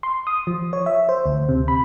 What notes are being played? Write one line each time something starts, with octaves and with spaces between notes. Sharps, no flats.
C6
D#6
F3
C#5
E5
C5
D2
C3
B5